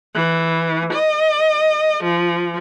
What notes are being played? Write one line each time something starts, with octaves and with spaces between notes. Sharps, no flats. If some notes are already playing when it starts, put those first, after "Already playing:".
E3
D#5
F3